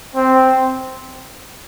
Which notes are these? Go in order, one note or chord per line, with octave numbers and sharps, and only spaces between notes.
C4